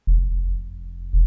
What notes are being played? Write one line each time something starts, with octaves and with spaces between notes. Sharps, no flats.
F1